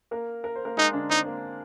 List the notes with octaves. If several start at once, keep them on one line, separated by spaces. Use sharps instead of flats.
A#3 A#4
A#4
C5
A#3 A#4
G#3 D#4 G#4
D3 D4
C4 D#4
A#3